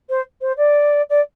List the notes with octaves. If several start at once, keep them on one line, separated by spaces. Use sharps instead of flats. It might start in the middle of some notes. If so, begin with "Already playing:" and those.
C5
C5
D5
D5